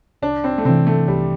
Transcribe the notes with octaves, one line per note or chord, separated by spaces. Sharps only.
C2 D4
C4
A3
C3 E3 C4
A3
C2 G3